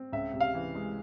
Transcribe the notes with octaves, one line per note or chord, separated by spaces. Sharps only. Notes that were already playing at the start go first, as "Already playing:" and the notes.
Already playing: C4
C#2 E5
C3
F5
E3
G#3